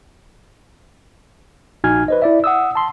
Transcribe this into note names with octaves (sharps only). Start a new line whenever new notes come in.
A#1 D#4 F#4 G#5 F6 G#6
B4 C5 D#5
E4 D5 E5
F#5 D#6 E6
A5 C6